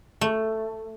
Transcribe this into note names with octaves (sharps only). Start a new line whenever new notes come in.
A3